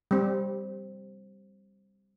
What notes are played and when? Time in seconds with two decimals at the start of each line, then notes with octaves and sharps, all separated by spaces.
0.11 G3 C4